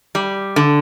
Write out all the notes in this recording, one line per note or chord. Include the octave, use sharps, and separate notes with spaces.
G3
D3